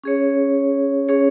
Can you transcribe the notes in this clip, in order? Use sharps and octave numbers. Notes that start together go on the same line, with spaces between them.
C#4 G#4 C#5
C#4 G#4 C#5